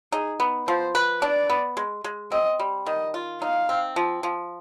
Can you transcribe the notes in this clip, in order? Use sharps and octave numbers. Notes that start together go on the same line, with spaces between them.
D#4 G#4
B3
F3 C5
B4
D4 D5
B3
G#3
G#3
C4 D#5
G3
D#3 D#5
F4
D#4 F5
C4
F3
F3